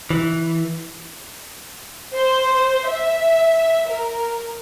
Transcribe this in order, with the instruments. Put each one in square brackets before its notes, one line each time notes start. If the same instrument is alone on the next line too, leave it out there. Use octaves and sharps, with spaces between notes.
[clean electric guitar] E3
[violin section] C5
E5
A#4